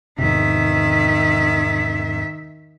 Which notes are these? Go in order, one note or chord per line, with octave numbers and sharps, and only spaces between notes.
E2 G#2 C3 D#3 E5